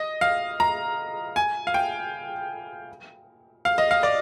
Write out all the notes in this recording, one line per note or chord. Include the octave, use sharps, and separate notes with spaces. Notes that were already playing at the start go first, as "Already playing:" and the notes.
Already playing: D#5
F5
A#5
G#5
F5
G5
F5
D#5
F5
D5